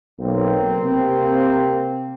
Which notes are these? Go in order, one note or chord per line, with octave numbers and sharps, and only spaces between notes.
B1 A#3 C4
C3